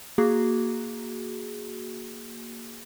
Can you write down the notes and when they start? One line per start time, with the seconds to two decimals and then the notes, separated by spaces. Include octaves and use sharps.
0.18 A#3 F#4 G#4